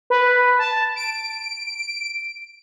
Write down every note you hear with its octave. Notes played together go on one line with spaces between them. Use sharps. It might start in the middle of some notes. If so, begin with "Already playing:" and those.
B4
A5
D7